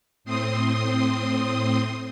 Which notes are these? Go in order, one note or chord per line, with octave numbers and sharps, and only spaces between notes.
A2 C4 C6 D#6